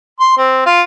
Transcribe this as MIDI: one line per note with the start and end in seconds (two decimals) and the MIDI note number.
0.20 0.37 84
0.37 0.65 60
0.66 0.82 65